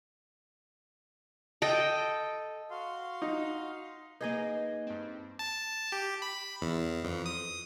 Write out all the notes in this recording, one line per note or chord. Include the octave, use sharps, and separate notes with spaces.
A4 D#5 G5
F#4 F5 C6
D#4
A#3 D#4 G#4 B4 D#5
G2 C4
A5
G4
B5
E2
F2
D#6